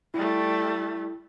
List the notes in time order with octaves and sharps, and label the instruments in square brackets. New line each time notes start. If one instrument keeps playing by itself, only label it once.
[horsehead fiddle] G3 A3 [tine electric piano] E4